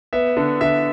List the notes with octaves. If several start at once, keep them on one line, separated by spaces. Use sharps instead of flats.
B3 E5
D3
D3 E5